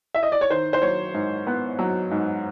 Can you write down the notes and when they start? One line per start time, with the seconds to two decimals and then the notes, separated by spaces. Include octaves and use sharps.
0.14 E5
0.23 D#5
0.32 D5
0.41 C#5
0.50 D#3 C5
0.73 C5
0.82 F#3 C#5
1.14 G#2
1.47 B3
1.79 F#3
2.11 G#2